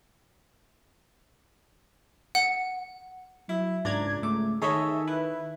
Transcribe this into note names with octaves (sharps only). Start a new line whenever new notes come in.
F#5
F#3 E4
C#2 G#2 D4 A#5 G#6
A3 D6
D#3 G#4 A4 C#5 D#5 E5
E4 B4